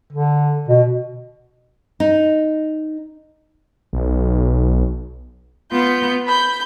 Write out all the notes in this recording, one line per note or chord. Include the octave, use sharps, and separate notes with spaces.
D3
B2
D#4
B1
B3 F4 G6
B5 G6